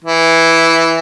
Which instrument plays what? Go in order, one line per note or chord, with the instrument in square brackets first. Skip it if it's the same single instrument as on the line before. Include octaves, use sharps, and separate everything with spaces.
[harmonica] E3